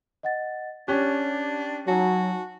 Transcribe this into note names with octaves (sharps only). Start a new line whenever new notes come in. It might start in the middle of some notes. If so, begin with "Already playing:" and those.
D#5 F#5 A6
C#4 D4 G4 F#6
F#3 D#4 F#4 G#5 A5